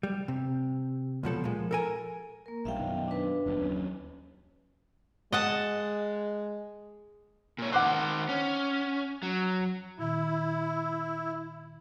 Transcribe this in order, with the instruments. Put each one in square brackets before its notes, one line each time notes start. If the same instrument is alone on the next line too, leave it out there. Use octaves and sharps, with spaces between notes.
[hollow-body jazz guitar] G3
C3
C#2 B2 F3 A4
A#2 F3 G#3
A4 A#4 G#5
[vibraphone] A#3 A#4
[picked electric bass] A#1 G3 [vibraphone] E5 F5 G5
[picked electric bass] F#2 B2 D#3
[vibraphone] D4 B4
[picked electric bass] F#1 E2 G2
D#2 F#3 C#4
[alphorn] G#3 [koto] D#5 F#5 A5
[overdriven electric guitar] A#2 C#5
[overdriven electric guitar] D#3 C5 [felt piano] F#5 D6 F#6
[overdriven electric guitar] C#4
F#3
[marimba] A#2 D#3 [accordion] E4